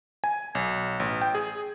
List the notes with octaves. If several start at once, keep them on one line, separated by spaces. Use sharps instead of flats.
G#5
B1
A1
G5
G#4